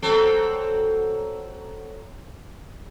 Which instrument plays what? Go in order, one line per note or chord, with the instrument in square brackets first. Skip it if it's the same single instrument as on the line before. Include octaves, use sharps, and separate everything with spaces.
[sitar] F#3 C4 A4